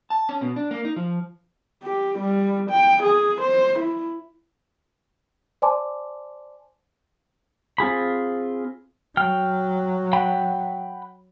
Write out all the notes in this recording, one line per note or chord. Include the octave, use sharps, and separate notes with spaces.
A5
C#4
B2
D4
A#3
D#4
F3
G4
G3
G5
G#4
C5
E4
C5 D5 G#5 A5 C6 D6
C4 F4 G#4 B5
F#3 G5 F6
F#5 G5 B5